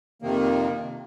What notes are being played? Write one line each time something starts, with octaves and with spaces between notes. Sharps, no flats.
F2 C3 D#3 A#3